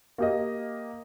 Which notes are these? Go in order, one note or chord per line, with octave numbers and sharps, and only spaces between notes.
A#3 G4 D#5